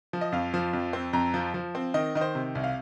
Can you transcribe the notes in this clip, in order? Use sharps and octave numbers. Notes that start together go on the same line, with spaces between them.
F3
D#5
F2 F5
F3
F2
C4
F2 A#5
F3
F3
C4
D#3 D#5
D#3 D#5
C5
C3
C2
F5